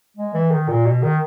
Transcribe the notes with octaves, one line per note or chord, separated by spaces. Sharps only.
G#3
E3
D#3
A#2
B2
D#3